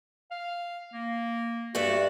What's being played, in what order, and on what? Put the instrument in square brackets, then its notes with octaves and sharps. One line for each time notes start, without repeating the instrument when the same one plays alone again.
[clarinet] F5
A#3
[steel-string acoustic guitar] G2 D5 E5 [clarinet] F#4